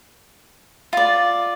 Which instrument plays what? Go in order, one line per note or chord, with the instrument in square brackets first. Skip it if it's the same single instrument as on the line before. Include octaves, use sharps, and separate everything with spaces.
[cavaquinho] F4 D5